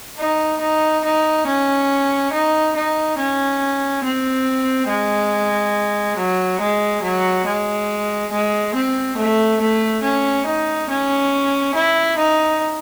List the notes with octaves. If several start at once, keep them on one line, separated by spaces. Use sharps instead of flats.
D#4
D#4
D#4
C#4
D#4
D#4
C#4
C4
G#3
F#3
G#3
F#3
G#3
G#3
C4
A3
A3
C#4
D#4
C#4
E4
D#4